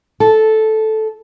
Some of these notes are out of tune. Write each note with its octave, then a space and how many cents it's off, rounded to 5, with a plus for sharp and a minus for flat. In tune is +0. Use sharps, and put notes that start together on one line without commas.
A4 -10